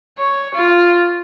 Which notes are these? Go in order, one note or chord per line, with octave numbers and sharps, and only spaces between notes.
C#5
F4